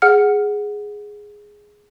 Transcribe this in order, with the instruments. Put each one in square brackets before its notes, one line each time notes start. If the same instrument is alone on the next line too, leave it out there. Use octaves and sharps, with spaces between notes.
[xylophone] G#4 F#5 F6 C#7